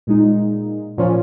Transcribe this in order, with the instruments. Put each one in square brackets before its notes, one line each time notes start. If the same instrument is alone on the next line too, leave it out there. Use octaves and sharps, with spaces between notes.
[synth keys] A#2 G#3 D#4
A#2 F3 C#4 F4